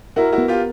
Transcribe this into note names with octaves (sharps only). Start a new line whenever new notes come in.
E4 F#4 A#4
E4 F#4
B3
F4 G4